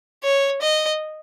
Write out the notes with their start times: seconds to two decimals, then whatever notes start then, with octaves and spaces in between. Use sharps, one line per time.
0.24 C#5
0.62 D#5